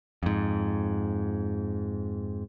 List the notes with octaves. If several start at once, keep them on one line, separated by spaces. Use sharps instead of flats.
F2 G#2